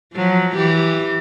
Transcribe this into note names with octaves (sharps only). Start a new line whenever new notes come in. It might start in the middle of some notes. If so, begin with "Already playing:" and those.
F3 F#3
E3 G4